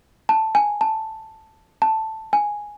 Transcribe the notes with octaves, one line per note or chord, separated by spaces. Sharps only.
A5
G#5
A5
A5
G#5